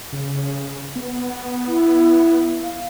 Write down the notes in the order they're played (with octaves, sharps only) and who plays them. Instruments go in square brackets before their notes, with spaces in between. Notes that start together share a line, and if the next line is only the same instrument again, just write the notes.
[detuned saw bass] C#3
B3
[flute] E4
F5